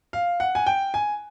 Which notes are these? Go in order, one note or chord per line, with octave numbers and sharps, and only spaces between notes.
F5
F#5
G#5
G5
G#5